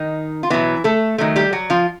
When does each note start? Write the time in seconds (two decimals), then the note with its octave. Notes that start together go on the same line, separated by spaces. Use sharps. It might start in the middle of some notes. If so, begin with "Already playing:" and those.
Already playing: D#3 D#4
0.43 F4
0.50 B2 E3 F#3 B3 E4
0.84 A3 A4
1.18 D#3 F#3 A3
1.36 G3 G4
1.53 F#3 F#4
1.70 F3 F4